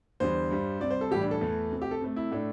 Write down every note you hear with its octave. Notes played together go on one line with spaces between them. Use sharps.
E2 D3 G3 C5
G2 G3
C3 G3 D5
C5
A4
A2 E3 G3 G4
D4
A4
E2 E3 A3
C3 A3
G4
A4
C3 A3
E4
A2 A3 D4